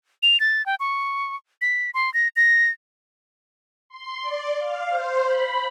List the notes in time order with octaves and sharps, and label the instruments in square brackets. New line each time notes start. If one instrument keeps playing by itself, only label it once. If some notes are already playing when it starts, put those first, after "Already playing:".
[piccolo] F7
A6
G5
C#6
B6
C6
A#6
A#6
[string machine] C6
D5
F5
C5
B5